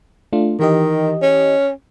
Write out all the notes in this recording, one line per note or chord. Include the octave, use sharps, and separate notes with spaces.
A3 D4 F4
D#3 E3 G4 D#5
C#4